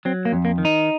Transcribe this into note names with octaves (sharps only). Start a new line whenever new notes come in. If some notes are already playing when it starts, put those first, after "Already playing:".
F#3 C4
A#3
F2
A#3
D#3
D#4